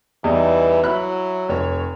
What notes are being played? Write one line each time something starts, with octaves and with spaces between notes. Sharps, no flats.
E2 E3 G3 D#4
F#3 E4 B5 F#6
F1 C#5